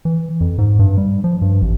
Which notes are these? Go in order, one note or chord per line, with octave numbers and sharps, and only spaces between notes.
E3
F2
G#2
G2
G3
F3
G2
A1